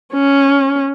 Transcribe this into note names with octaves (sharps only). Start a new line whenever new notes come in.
C#4